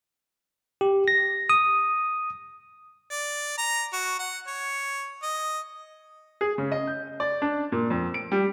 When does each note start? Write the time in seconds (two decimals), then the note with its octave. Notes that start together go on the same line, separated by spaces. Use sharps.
0.81 G4
1.08 A#6
1.50 D#6
3.11 D5
3.58 A#5
3.93 F#4
4.19 F#5
4.47 C#5
5.23 D#5
6.41 G#4
6.58 C#3
6.72 D#5
6.87 G6
7.20 D5
7.42 D4
7.72 A#2
7.90 F2
8.14 D7
8.32 G3